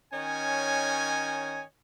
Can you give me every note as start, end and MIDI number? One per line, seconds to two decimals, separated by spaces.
0.13 1.63 51
0.13 1.63 61
0.13 1.63 73
0.13 1.63 75
0.13 1.63 80